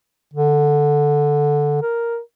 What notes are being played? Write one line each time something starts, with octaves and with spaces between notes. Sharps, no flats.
D3
A#4